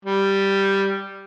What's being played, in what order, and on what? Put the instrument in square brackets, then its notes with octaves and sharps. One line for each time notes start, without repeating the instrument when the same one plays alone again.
[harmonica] G3